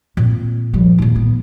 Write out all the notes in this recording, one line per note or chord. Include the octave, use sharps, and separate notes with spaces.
A#2 C4
F3 G3
D#2 A#2
B3